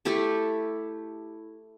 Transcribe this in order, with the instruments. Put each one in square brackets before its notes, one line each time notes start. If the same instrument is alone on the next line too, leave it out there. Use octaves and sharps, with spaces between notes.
[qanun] A3 E4 G4 A4